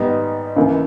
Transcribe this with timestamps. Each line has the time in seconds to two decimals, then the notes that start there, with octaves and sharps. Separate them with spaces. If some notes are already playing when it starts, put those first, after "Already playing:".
Already playing: G#2 G3 B3 D#4
0.56 C#2 C#3 E3 A#3